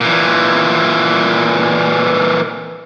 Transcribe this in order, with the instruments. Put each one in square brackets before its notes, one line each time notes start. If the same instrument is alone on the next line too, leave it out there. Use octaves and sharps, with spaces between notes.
[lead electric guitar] A#2 E3